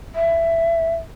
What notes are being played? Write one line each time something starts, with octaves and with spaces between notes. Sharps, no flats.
E5